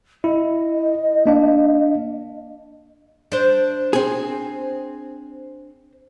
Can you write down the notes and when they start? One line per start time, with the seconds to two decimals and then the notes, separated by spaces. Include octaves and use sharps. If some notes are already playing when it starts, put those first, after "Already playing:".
0.24 E4 D#5
1.26 A#3 D4 F5
3.32 D4 C5
3.93 C4 G#4